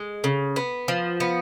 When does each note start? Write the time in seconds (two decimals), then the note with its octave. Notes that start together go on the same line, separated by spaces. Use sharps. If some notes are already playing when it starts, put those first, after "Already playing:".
Already playing: G#3
0.24 C#3
0.56 B3
0.88 F3
1.20 B3